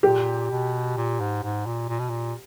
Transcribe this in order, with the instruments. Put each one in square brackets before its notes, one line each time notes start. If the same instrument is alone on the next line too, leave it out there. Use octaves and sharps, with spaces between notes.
[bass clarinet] A#2 [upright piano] G4
[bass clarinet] B2
A#2
G#2
G#2
A#2
A#2
B2
A#2